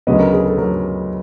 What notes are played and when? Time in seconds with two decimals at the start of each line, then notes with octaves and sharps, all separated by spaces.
0.07 D2 C#3 F#3 B3 D#5
0.19 A#4
0.33 G#4
0.45 A4
0.58 F#3 A#4